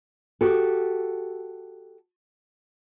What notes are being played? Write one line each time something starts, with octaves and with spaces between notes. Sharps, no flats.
F#4 G4 A4